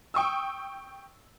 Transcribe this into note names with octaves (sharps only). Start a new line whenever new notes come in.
G5 C#6 D#6 E6